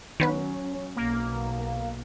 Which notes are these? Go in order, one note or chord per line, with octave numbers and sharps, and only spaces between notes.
D#3 F#3 B3 C#4 B4
B1 B2 A#3